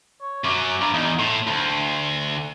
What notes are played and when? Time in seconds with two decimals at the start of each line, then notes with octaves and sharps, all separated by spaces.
0.21 C#5
0.45 F#2 F#3 D6
0.81 G2 A#5
0.94 E2 D#4
1.19 A2 C6
1.47 D2